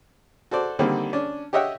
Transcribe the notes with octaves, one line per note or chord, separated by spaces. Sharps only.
F#4 A4 C5 D5
D3 D#3 G3 A#3 C4
C#4 D4
G4 C#5 D#5 E5 F#5 G5